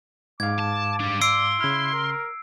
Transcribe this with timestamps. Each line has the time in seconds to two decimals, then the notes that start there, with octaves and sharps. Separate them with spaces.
0.40 G#2 F5 D6 G#6
0.59 A5
1.00 G3 D4
1.21 D5 C6 E6 C7 D7
1.60 C#3 E4 F6
1.93 A#4